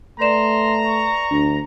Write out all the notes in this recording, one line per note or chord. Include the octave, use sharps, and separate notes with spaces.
A3 B4 D5 A#5 C6 E7
C#6
D2 D4